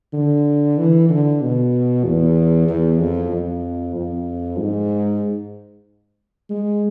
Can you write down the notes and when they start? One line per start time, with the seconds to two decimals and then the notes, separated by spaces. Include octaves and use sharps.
0.13 D3
0.78 E3
1.09 D3
1.42 B2
2.04 E2
2.69 E2
2.99 F2
3.32 F2
3.95 F2
4.59 G#2
6.50 G#3